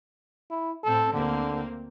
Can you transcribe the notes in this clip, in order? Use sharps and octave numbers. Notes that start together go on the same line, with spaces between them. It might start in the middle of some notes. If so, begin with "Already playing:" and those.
E4
A2 C4 A4
D2 D3 A#3 C4